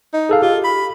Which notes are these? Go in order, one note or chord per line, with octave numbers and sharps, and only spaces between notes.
D#4
G#4 A4 F5
F4 G4
B5